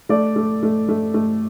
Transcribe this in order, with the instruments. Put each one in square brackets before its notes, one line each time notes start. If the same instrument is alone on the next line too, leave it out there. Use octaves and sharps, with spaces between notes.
[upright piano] A3 D5
A3
A3
A3
A3